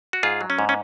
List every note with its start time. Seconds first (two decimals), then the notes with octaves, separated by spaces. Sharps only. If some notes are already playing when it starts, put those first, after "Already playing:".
0.13 F#4
0.23 G#2 F4 G#4
0.41 F#3
0.50 C#4
0.59 G#2
0.69 C#4